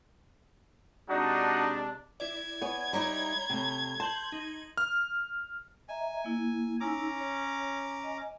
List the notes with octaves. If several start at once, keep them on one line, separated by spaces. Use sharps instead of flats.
C3 G#3 D4 D#4 F#4
E4 D5 G#6
B3 C#5 G#5
G3 D#4 E4 C#5 A#5 B5
C3 A3
A5 C6 G6 F#7
D#4
F6
D#5 E5 G#5 A#5
A#3 E4
C#4 D#4 G#5 A#5 D6 E6
C#5
D#5 G#5